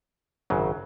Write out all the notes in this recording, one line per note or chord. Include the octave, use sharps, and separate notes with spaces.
G#1 F#2 C#3 F#3